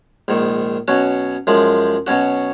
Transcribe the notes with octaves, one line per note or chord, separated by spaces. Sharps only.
A#1 G#2 D#3
B2 F#3 C#4 F#4
F#2 F3 G#3
B2 F#3 C#4 F#4